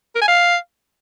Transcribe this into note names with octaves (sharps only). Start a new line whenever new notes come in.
A#4
G#5
F5